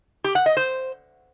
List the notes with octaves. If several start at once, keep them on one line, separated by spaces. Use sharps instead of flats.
G4
F#5
D#5
C5